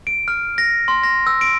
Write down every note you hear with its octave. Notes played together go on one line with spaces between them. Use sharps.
D7
F6
A#6
C6
A#6
E6
D7